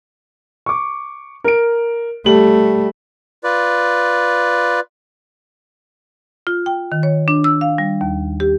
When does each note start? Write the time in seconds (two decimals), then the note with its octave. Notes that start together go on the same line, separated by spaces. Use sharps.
0.66 C#6 D6
1.44 A#4 D7
2.26 G3 A3 F#7
3.44 F4 B4 D5
6.47 F4
6.66 G5
6.92 D#3
7.03 C#5
7.28 D4
7.44 E6
7.61 F5
7.78 G3
8.01 D#2
8.40 G4